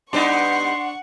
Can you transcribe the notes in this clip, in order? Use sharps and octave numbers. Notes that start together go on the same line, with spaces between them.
G3 B3 D4 D#4 F#5 C6 C#6